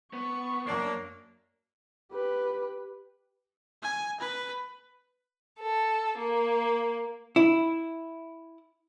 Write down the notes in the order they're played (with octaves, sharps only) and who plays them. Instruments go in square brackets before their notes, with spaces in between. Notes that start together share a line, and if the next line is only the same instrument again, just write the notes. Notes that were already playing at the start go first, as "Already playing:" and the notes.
[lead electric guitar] B3 [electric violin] C#6
[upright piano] F#2 C#5 C7 [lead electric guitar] A#3 [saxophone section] D4
[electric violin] G4 B4
G#5
B4
[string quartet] A4
A#3
[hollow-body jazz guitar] E4